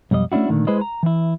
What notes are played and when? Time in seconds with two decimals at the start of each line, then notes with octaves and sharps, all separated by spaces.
0.11 B1 F2 G3 D#5
0.32 A3 C#4 D4 E4 F#4
0.49 A#2 D3 D#3 A3
0.67 G#3 E4 G#4 B4 C5 D#5
0.81 A#5
1.03 E3 E4